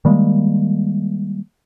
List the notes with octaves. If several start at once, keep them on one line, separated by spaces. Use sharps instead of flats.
D#3 G3 G#3 A#3